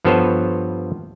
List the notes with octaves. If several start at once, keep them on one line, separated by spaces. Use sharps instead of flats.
G2 F3 B3 A4 C5 C#5